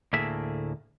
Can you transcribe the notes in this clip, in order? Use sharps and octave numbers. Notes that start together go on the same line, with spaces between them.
D2 A2 A3 A#3 G#4 E5